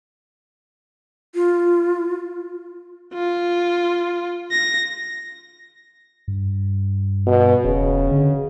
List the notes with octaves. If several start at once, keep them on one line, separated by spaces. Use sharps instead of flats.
F4
F4
A#6
G2
B2
E1 C#3
D3